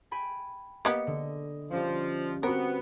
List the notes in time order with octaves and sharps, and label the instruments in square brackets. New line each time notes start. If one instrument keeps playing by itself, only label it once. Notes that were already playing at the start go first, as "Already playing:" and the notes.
[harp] G5 G#5 B5
[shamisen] A#3 B3 G4 [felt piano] D#5 [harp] C#7
[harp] D3
[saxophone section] F3 [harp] G3 C#4
[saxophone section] B3 [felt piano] C4 F#4 [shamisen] A#4